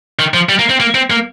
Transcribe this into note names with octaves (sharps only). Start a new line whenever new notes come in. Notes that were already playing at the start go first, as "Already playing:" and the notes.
D#3
F3
G3
A#3
C4
A#3
C4
A#3